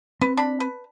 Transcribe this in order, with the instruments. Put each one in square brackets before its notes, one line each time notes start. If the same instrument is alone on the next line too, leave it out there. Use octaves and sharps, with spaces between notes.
[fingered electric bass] C4 [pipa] B4
[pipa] D4 B5
B4